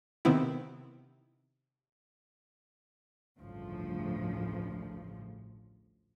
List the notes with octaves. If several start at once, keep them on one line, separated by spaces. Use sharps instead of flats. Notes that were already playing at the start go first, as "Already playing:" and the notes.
C3 D#3 B3 C4 E4
A1 D2 G2 C#3 F3